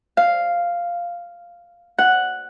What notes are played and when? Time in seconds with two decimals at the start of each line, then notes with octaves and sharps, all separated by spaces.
0.17 F5
1.98 F#5